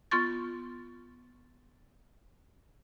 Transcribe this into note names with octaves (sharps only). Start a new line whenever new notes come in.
B3 F4 C6 C#6 A6